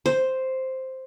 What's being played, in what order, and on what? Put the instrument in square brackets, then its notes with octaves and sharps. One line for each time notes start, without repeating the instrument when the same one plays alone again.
[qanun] C5